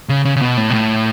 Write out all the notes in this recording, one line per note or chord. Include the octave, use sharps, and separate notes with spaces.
C#3
C#3
C#3
B2
A2
B2
A2